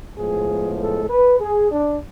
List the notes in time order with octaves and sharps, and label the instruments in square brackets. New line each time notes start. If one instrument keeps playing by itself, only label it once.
[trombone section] A2 F3 G#3 B3 G#4
A4
B4
G#4
D4